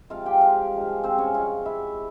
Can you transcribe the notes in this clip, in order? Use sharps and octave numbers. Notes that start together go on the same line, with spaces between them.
C3 F3 G#3 F4 F5
G4 G5
F4 F5
G2 F3 G#3
C4 C5
C#4 C#5
C3 F3 G#3 F4 F5
E4 E5